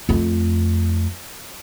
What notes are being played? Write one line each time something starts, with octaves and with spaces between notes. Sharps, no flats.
F2 A3